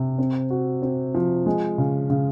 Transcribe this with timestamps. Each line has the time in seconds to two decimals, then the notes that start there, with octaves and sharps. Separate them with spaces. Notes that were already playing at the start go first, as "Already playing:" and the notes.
Already playing: C3
0.18 C4
0.50 F#4
0.82 C4
1.14 F3
1.46 G#3
1.78 C#3
2.10 C#3